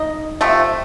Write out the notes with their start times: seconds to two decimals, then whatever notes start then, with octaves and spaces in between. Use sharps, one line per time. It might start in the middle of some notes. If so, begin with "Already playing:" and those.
Already playing: D#4 D#5
0.41 C3 F3 A3